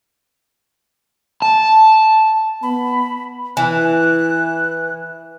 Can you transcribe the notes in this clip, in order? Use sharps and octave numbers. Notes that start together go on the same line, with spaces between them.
A5
B3 B5
E3 F#6